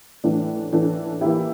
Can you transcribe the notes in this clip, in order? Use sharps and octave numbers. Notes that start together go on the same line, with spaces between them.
A2 E3 A3 D4
A2 E3 A3 D4
E3 A#3 E4 G4